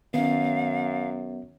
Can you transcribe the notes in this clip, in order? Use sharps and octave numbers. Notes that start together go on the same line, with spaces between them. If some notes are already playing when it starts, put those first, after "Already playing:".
F#2 D#3 B3 C#4 F5